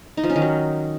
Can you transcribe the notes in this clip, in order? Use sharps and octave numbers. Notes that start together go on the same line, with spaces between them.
D#4
F3
C#4
D#3
F#3